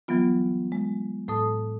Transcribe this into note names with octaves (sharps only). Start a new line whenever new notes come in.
E3 F#3 G3 B3 F4
G#3
A2 A4 A5 D#6